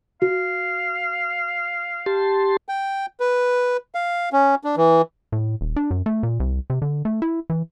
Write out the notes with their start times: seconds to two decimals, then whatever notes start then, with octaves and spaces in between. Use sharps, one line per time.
0.22 F#4 F5
2.06 G4 A5 C6
2.69 G5
3.20 B4
3.95 F5
4.33 C#4
4.64 D4
4.77 E3
5.32 A2
5.61 D#1
5.76 D4
5.91 F#2
6.06 A3
6.23 A#2
6.40 C2
6.70 C3
6.82 D3
7.05 A3
7.22 E4
7.50 E3